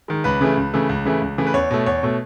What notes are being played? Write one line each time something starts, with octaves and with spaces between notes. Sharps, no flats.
D#3 G#3
C#2 B4
C#3 E3 A3
C#2
C#3 E3 A3
C#2
C#3 E3 A3
C#2
C#3 E3 A3
B4
E2 C#5
B2 A3
E2 C#5
B2 A3